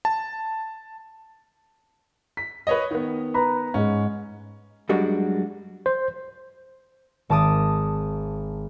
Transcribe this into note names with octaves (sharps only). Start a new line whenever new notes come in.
A5
B6
B4 C#5 D#5
D#3 B3
B4 A#5 B5
G#2 G#3 C#4
F#2 G3 G#3 D4 F#4
C5
G#1 A5 D6 D#6